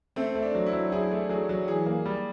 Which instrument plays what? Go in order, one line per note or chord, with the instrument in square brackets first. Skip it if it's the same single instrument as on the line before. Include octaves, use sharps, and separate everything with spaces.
[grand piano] A3 [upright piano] C4
[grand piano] A3
[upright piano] D4
[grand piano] F#3
[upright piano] E4
[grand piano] F#3
[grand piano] E4 [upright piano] G#4
[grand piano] A3
[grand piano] F#3 [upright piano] G#4
[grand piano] F#3
[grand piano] E3 [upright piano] G#4
[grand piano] A#3
G3